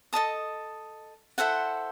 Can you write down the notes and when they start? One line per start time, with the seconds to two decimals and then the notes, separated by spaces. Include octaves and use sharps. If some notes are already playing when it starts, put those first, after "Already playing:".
0.13 A4 D#5 A5 D#6
1.38 E4 A4 C5 F#5